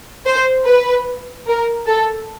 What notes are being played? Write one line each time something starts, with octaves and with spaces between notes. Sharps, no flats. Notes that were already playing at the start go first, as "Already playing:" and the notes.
C5
B4
A#4
A4